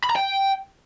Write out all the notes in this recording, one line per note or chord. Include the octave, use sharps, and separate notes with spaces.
B5
A#5
G5